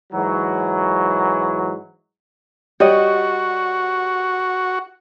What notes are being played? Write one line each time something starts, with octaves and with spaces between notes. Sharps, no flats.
G#2 E3 F#3
G3 F#4 G4 C#5 D#5